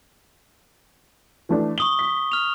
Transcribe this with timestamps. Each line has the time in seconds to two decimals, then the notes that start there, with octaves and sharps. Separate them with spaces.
1.49 E3 A3 D4
1.78 C#6 D#6 F#7 G7
1.99 B6
2.32 F6 F7